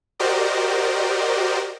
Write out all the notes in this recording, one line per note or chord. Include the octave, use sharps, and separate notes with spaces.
F#4 G4 A#4 C5 D5 D#5